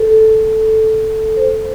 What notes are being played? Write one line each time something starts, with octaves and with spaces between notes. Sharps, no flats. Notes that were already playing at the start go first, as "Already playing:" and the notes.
Already playing: A4
C5